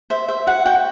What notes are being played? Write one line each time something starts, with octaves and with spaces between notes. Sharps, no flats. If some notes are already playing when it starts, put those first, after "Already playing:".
C5 E5
C5 E5
F#4 F#5
F#4 G5